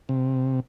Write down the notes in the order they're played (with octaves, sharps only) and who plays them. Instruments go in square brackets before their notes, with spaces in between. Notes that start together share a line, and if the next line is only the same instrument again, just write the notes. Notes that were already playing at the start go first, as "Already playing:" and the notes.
[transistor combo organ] C3